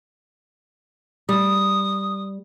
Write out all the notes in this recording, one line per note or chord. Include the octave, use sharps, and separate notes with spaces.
G3 D#6